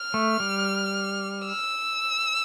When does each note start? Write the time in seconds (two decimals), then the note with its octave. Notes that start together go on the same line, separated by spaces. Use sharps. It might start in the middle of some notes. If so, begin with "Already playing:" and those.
Already playing: F6
0.14 A3
0.40 G3
1.46 E6